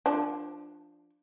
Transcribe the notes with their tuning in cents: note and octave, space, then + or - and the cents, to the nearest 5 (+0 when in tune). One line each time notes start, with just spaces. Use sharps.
F3 +0 D4 +5